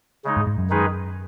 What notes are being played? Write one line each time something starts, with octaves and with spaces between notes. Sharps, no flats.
C#3 G#3 D#4
G#2
G#2
F#2
D#3 G#3 D#4 G#4 B4